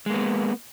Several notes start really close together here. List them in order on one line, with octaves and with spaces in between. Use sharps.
G#3 A#3 B3